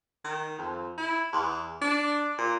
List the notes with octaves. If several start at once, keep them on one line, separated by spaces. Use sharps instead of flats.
D#3
F2
E4
E2
D4
A#2